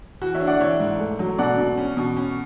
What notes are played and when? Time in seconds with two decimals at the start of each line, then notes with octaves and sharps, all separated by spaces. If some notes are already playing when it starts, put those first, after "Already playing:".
0.22 E3 F#4
0.35 C#5 E5
0.41 D4
0.47 D5 F#5
0.60 E3 C#5 E5
0.80 G#2
0.99 A3
1.19 F#3
1.38 B2 D5 F#5
1.58 B2
1.78 C#4
1.97 B2
2.17 C#4